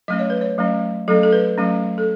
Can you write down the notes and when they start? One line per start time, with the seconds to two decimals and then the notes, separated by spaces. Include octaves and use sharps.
0.08 F#3 A3 C#4 D#5
0.19 C#5
0.30 B4
0.41 C#5
0.58 F#3 A3 C#4
1.08 F#3 A3 C#4 A4
1.23 A4
1.33 B4
1.58 F#3 A3 C#4
1.98 A4